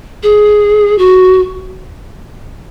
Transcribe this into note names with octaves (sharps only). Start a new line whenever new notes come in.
G#4
F#4